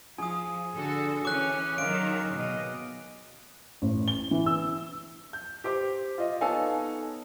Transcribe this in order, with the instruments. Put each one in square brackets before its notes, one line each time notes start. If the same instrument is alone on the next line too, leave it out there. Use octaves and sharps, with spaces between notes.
[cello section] F3 [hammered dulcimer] G#4 [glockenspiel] G#5 D#6
[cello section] D3 F#4 A4
[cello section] E3 C#4 [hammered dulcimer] C#5 [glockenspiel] D6 F#6
[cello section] D#3 F#3 [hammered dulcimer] F5 [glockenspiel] D7
[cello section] B2 D#5
[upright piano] A1
G7
E3
E6
[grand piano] G6
G4 C5 D6
F4 D#5
B3 D#4 A4 C#5 F5 G#5